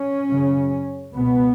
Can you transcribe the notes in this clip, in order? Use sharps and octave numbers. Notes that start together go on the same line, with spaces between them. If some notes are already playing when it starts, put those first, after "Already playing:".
Already playing: C#4
F#2 C#3
C#2 B2 B3